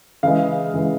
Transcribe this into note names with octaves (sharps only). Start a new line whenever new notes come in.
C#3 E3 G#3 F5
C#3 E3 G#3